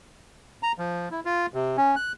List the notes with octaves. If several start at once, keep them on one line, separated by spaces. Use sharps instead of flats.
A#5
F3
E4
F4
C3
C#4
F#6